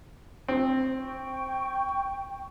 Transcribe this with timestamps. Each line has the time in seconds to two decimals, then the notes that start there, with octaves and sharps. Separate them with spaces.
0.49 C4
1.00 G5 C#6